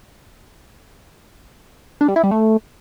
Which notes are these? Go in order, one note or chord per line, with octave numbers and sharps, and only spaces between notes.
D4
G3
E4
G3
A3